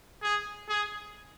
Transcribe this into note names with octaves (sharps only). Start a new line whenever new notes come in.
G#4
G#4